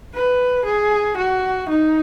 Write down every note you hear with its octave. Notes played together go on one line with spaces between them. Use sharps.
B4
G#4
F#4
D#4